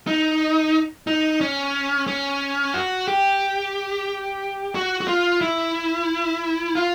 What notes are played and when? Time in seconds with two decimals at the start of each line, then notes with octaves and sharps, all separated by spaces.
0.07 D#4
1.07 D#4
1.41 C#4
2.07 C#4
2.74 F#4
3.08 G4
4.75 F#4
5.01 F#4
5.08 F4
5.41 E4
6.75 F4